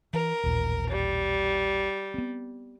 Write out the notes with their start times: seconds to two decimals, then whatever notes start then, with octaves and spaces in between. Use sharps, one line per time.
0.13 E3 A#4
0.43 A1 D#2 A#2
0.90 G3
2.14 B3 C4